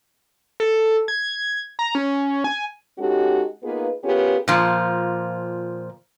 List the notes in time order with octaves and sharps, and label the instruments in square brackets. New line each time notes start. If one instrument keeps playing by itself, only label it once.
[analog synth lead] A4
G#6
A#5
C#4
G#5
[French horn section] G#3 C#4 D#4 F#4 G4 A4
A#3 B3 D#4 F4 G#4 B4
B3 C#4 F4 G4 G#4 A#4
[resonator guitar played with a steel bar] A#2 F3